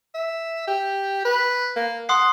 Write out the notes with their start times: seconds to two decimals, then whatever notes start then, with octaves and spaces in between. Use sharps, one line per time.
0.14 E5
0.67 G4
1.25 B4
1.76 A#3
2.09 F#5 C6 D#6 C7